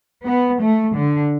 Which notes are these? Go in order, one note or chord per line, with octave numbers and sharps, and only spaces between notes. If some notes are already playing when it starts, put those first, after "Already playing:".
B3
A3
D3